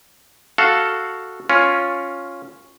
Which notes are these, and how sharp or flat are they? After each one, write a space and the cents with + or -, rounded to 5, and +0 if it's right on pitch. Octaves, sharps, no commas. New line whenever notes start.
F#4 +0 A4 +0 F5 +0
C#4 +0 F4 +5